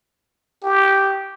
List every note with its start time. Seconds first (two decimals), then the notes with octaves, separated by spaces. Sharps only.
0.64 G4